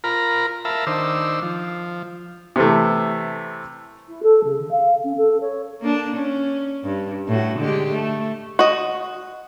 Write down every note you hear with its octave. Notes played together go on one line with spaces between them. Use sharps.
F4 A#4 A#5 B5
A#4 E5 F5 A5 B5
D#3 D4 C5 E6
F3
C3 E3 A3
E4
A4
C#3
D3
F5
C#4
A4
C#5
A#3 D4
C#4
G2
A2 F#4
D3 G#3 G4
A3
F#4 D#5